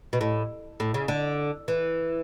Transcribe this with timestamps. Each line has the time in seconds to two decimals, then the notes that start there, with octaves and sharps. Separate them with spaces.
0.13 B2
0.21 A2
0.80 A2
0.94 C#3
1.08 D3
1.68 E3